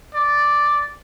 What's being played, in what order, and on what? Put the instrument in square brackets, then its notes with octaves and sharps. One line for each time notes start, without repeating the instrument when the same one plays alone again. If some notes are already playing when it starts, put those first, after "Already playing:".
[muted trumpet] D5